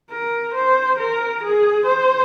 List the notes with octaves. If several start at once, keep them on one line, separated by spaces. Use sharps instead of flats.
A#4
C5
A#4
G#4
C5